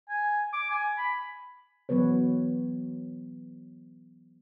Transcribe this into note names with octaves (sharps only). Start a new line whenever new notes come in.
G#5
D6
G#5
B5
E3 F#3 B3 B4 C#5